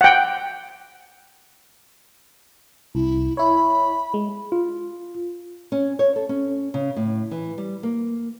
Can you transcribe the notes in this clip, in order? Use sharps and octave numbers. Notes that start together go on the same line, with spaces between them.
F#5 G5
C2 E4
E4 C#5 B5
G#3
F4
C#4
C#5
A4
C#4
C#3
A2
E3
G3
A#3